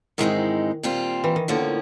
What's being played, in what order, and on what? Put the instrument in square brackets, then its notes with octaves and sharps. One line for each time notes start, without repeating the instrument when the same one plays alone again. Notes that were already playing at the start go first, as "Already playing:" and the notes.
[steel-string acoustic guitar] G#2 E3 G#3 C4 D#4 [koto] D#3
[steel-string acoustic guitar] A#2 G3 C4 F4
[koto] E3
D#3
[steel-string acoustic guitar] A2 F3 A#3 C#4 [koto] D3